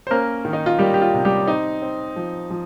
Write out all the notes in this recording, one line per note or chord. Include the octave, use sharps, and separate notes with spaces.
C5
A#3 C#4 A#4
D#3
D#4
F4
G3 A#3 G4
G4
F4
C3
G3 G4
C4 D#4
C4
F3
F3